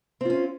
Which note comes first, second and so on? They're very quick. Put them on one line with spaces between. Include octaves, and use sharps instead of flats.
C4 F4 C#4